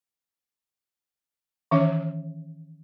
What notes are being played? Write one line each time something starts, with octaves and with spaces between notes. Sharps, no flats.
D#3 E3 C#4 C#5 E5